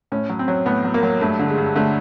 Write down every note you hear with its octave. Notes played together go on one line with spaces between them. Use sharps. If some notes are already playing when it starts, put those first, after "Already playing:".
A2 C#4
F#3
C4
F#3
A2 B3
F#3
A#3
F#3
G2 A3
D3
G#3
G2
D3 A3